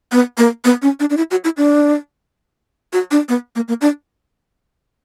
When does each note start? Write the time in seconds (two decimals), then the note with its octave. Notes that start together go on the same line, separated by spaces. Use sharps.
0.12 B3
0.38 A#3
0.65 B3
0.82 C#4
1.00 D4
1.10 D4
1.17 E4
1.31 F#4
1.44 E4
1.57 D4
2.93 F#4
3.11 D4
3.29 B3
3.56 A#3
3.68 A#3
3.81 D4